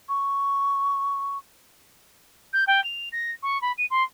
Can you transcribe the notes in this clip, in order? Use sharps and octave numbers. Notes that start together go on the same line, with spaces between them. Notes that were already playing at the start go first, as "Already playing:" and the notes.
C#6
G6
G5
F7
A#6
C#6
B5
D#7
C6